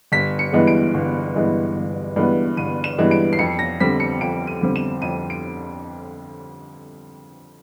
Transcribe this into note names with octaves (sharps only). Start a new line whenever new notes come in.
G1 B6
C#7
G2 E3 G#3 B3
D7
G1
G2 E3 G#3 B3
G1
G2 E3 G#3 B3
G1 D#7
E7
G2 E3 G#3 B3
D7
C7
F2 C#7
A#6
D3 G3 C4 B6
C#7
F2 D7
D#7
D3 G3 C4
E7
F2 D#7
D7